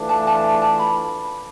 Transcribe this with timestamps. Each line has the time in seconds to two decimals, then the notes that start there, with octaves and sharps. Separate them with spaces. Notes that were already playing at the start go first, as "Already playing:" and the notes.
Already playing: E3 A3 D4 F4
0.09 A5
0.27 A5
0.62 A5
0.79 B5